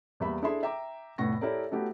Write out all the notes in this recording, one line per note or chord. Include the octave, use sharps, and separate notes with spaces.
E2 G3 A#3 E5 B5
D4 E4 G#4 A4 E5 C6
E5 G5 A#5 D6
F1 A2 B3 C#6 A#6
E4 G4 A4 A#4 C#5 D5
F#3 A3 B3 E4 F#4 G4